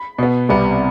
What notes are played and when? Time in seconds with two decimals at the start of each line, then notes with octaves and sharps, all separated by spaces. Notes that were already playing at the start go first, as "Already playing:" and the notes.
Already playing: B5
0.19 B2 B3
0.49 C2 C3 G3 B3